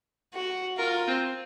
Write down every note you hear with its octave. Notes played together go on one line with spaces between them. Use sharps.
F#4
F4 A#4
C4